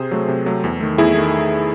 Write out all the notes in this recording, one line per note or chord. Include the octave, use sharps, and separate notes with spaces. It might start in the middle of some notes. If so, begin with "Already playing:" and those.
Already playing: C3 G#4 C5
F#3 A3
C3
F#3 A3
E2
D#3 A3
E2 E4 G#4
D#3 A3